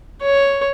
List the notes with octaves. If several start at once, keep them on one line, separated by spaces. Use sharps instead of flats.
C#5